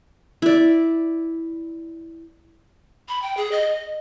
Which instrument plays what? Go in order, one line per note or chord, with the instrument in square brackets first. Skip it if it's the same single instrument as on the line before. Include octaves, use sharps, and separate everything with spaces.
[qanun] E4 D5
[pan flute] B5
G5
G#4
D#5